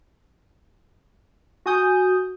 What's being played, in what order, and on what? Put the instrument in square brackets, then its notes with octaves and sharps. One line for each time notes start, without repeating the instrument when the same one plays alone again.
[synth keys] F#4 G#5 D#6 G6